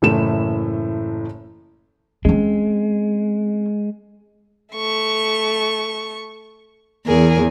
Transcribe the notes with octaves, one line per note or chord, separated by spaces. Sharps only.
F#1 A2 E3 A3 E4 E7
G#3 C4 C#4
A3 C#6
E2 G#4 A#4